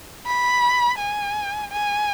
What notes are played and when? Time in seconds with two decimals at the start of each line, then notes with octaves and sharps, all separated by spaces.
0.26 B5
0.98 G#5
1.72 G#5